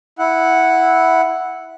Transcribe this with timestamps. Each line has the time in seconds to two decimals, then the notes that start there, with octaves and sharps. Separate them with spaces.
0.19 E4 F#5